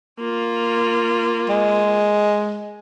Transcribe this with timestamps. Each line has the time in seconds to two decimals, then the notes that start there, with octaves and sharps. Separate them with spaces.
0.19 A#3 F4
1.49 G#3